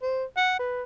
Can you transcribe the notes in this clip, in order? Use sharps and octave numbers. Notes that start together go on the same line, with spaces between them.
C5
F#5
B4